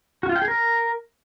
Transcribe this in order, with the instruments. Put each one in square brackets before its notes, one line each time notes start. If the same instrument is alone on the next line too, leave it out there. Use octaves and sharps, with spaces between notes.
[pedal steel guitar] F#4
F4
G5
G#4
A#4